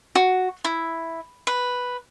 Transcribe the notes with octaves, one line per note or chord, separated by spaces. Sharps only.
F#4
E4
B4